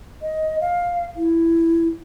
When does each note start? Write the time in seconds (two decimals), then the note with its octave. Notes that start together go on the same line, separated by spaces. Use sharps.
0.22 D#5
0.61 F5
1.16 E4